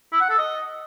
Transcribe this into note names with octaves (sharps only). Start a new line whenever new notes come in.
E4
F#5
A4
D#5